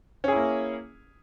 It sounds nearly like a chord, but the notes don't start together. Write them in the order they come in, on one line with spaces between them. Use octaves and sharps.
C#4 G#4 E4 A#3